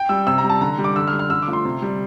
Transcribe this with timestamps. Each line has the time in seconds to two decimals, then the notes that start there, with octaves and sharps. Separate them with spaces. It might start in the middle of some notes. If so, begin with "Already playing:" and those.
Already playing: G5
0.09 G3 E6
0.27 C3 E6
0.38 A#5
0.44 G3
0.50 A5
0.61 D3 A#5
0.78 G3
0.84 D6
0.96 D3 E6
1.08 F6
1.13 G3
1.19 F6
1.30 D3 E6
1.42 D6
1.48 F3 A3
1.53 C6
1.65 C3
1.82 G3